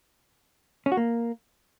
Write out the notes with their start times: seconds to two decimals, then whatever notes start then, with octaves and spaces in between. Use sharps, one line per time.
0.86 C#4
0.92 F#4
0.97 A#3